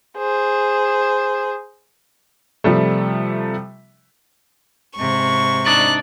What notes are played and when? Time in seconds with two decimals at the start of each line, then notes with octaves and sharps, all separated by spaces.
0.18 G#4 C5
2.64 C3 F3 G3 A3
4.97 G#2 C3 C#6
5.66 D4 D#4 D5 F#6